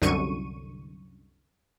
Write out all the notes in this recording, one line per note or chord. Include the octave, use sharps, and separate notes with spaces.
C2 F#2 D3 C#6 D#7